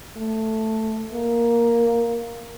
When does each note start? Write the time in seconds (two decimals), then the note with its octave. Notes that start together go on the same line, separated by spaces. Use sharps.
0.17 A3
1.13 A#3